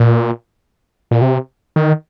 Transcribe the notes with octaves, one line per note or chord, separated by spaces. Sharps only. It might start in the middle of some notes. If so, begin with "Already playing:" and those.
Already playing: A#2
A#2
C3
D#3